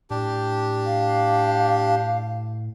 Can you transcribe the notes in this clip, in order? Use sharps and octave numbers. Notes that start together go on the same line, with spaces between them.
A2 D4 G4
F5